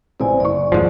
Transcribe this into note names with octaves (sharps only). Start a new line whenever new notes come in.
A1 C3 C5 D5 G#5
F#1 D5 C#6
D#2 G#2 F3